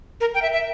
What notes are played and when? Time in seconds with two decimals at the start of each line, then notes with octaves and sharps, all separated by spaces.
0.21 A#4
0.34 G5
0.42 E5
0.53 E5